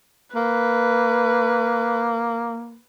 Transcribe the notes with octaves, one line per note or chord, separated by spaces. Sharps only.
A#3 B4